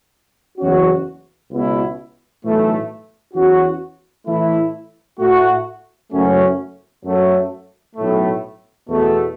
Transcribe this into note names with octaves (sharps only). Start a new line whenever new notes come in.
F#1 E2 E3 C#4 F#4
C#2 B2 B3 E4
B1 A2 E3 A3
E2 E3 C#4 F#4
A2 E3 A3 E4
A2 A3 F#4
F#1 F#2 F#3 A3 C#4
F#2 F#3 A3
B1 A2 A3
E2 B2 A3